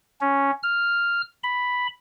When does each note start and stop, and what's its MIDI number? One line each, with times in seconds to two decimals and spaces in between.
0.21 0.51 61
0.63 1.22 89
1.44 1.87 83